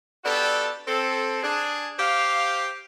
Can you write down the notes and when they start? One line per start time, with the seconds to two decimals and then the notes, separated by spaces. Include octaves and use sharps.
0.24 B3 D4 F#4 G4 A4
0.86 C4 A4
1.43 D4 G#4
1.99 G4 C5 F5